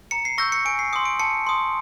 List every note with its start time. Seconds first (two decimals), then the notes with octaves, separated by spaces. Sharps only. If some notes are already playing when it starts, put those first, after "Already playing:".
0.11 A#5 C#7
0.25 C7
0.38 C#6 E6 G6 A#6
0.52 C#7
0.65 G#5 D7
0.79 C7
0.93 C6 D#6 C#7
1.05 D7
1.20 A5 C#7
1.47 C6 D#6